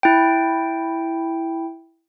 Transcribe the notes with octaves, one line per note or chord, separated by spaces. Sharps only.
E4 G5